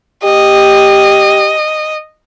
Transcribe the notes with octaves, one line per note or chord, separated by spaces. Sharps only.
G4 D#5